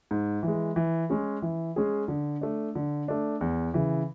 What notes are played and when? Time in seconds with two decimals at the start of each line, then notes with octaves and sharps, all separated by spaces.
0.11 G#2
0.43 E3 G#3
0.76 E3
1.10 G#3 C#4 G#4
1.42 E3
1.76 G#3 C#4 G#4
2.08 D3
2.41 A3 D4
2.75 D3
3.08 A3 D4
3.41 E2
3.74 C#3 E3